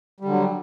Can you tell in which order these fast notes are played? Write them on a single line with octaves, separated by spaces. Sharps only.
G3 D3 F#3